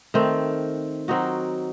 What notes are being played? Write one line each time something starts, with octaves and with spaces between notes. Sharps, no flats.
D#3 A3 C4
F#3 C4 D#4 F#4